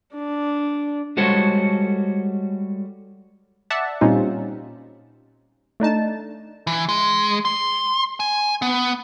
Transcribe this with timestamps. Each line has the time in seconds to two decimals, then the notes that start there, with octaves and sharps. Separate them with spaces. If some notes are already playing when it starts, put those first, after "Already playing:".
0.15 D4
1.17 G3 G#3 F#4 A4 C5 C#5
3.70 D5 E5 F#5 A5
4.01 A#2 G3 C4 C#4 D#4 F4
5.80 A3 D4 D#4 A5
6.67 E3
6.89 G#3
7.45 C6
8.20 G#5
8.62 B3